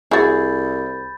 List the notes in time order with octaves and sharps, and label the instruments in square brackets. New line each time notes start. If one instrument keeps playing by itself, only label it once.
[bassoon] C2 [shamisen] E4 F#4 [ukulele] G#4 [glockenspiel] B5 G6 A6